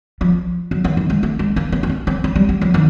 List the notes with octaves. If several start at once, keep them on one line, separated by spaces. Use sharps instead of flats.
F3
F#3
E3
D#3
G#3
A3
G#3
A#3
B3
C4
C#4
C4
C4
G3
G3
F3
D#3